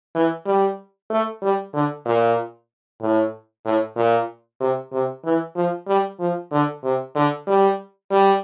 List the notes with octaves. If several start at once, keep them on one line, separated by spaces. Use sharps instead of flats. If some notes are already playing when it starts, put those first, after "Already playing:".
E3
G3
A3
G3
D3
A#2
A2
A2
A#2
C3
C3
E3
F3
G3
F3
D3
C3
D3
G3
G3